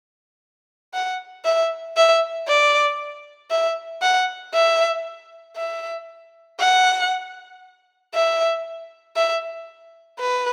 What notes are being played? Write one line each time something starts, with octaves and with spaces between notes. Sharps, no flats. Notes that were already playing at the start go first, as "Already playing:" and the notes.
F#5
E5
E5
D5
E5
F#5
E5
E5
F#5
E5
E5
B4